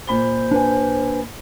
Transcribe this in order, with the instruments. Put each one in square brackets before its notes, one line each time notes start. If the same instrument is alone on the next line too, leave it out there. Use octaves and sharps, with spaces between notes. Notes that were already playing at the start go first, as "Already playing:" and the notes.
[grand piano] A#2 B5 G7 [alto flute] C5
[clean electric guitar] D4 B4 G#5